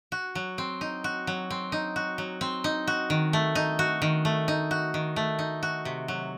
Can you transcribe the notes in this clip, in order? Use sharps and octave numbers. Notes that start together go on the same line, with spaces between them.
F#4
F#3
C4
D#4
F#4
F#3
C4
D#4
F#4
F#3
C4
D#4
F#4
D#3
A3
D#4
F#4
D#3
A3
D#4
F#4
D#3
A3
D#4
F#4
C3
F#3